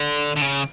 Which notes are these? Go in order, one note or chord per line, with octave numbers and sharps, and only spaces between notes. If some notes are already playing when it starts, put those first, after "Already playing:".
Already playing: D3
D3
C#3